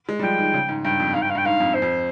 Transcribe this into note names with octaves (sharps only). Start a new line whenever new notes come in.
G#3
G3
F3 G5
D#3
C#3
G#2
G2 G5
F2
G#2 F5
G2 G5
F5
G2
G5
G#2 F5
F2
C5
F2